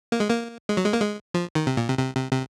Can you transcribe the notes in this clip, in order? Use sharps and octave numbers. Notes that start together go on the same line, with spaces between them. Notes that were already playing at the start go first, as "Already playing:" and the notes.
A#3
G#3
A#3
G#3
F#3
G#3
A#3
G#3
F3
D#3
C3
A#2
C3
C3
C3
C3